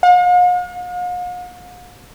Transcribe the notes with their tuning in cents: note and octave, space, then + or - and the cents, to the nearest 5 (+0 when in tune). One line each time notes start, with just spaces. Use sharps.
F5 +45